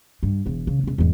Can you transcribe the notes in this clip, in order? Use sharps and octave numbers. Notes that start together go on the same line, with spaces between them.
G2
E1 E2
C#3
E1 C#4
E2 G#2